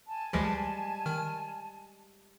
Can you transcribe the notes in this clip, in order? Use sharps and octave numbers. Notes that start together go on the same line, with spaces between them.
G#5 A5
D2 E3 F3 G3 G#3
D#3 F6